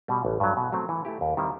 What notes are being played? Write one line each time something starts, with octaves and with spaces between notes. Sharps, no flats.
B2 G3
A1
G2 F#3
B2
F#3 A3 C4
E3
A3 E4 G4
D#2
D#3 G3 C4 E4